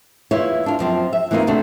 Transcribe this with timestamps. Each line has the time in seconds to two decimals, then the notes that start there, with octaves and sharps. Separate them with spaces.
0.31 E2 E4 F4 B4 C#5
0.66 D4 F4
0.79 F#2 F3 C4
1.13 E5
1.31 E3 A#3 C4 D#4 F4
1.47 C3 A3 D4 F#4